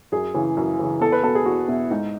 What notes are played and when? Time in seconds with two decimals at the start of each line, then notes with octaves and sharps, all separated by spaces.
0.12 F#2 G#4
0.34 C#3 E3
0.57 F#2
0.79 C#3 E3
1.01 E2 A4
1.12 B4
1.24 B2 A4
1.35 G#4
1.46 E2 F#4
1.68 B2 E4
1.91 G#2 D#4